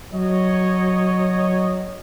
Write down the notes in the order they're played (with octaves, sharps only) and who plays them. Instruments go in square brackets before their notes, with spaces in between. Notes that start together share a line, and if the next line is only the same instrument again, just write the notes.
[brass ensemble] F#3 C#5 D#5